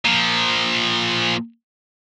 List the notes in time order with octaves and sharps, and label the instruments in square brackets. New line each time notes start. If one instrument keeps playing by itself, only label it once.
[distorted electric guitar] A#2 F3